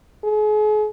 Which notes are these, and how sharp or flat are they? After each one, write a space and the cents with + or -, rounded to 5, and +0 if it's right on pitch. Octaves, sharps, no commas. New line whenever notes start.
G#4 +40